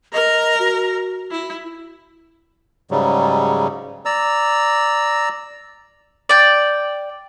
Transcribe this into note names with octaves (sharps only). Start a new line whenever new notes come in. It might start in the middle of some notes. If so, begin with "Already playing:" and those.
A#4 D#5 A#5
F#4
E4
G#2 C#3 F#3 G3
D5 A#5 E6
D5 G5